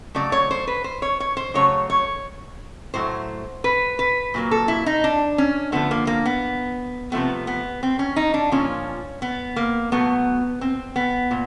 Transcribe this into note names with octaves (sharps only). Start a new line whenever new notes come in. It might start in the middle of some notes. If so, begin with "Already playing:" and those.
C#3 F#3 A3 D5
C#5
C5
B4
C5
C#5
C#5
C5
C#3 F#3 A3 C#5
C#5
A2 F#3 A3 C5
B4
B4
A#2 F#3 A#3
A4
E4
D#4
D4
C#4
D3 F3 A3 B3
A#3
A#3
B3
C3 F3 A3 B3
B3
C4
C#4
D#4
D4
A#2 F3 A#3 C#4
B3
A#3
B2 F#3 A3 B3
C4
B3
A#2